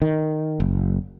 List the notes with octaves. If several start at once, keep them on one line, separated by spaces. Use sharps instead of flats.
D#3
F#1